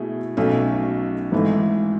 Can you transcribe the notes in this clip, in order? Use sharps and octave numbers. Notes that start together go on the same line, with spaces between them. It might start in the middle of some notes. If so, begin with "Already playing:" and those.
Already playing: B2 A3 E4 G#4
B1 B2 A3 C#4
G#1 G#2 E3 A3